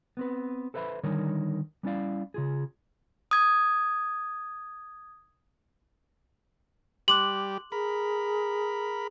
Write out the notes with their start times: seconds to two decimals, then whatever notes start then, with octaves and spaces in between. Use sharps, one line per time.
0.17 B3 C4 B4
0.74 A4 B4 C5 E5 B5
1.04 D3 D#3 G3 D#4 A#4 C#5
1.83 G3 B3 C#4 E4 D5 F5
2.34 C#3 F4 G#4
3.31 D#6 G#6
7.08 G3 G4 C6 D6 F#6 F#7
7.72 G#4 A#4 B5